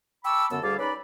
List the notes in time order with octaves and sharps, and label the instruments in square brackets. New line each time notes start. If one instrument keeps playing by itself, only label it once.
[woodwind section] G5 A5 B5 C#6 D6 E6
F#2 D3 B3 A4 E6
D2 G3 G#4 F5 A5 D6
C#4 D#4 B4 D5 B5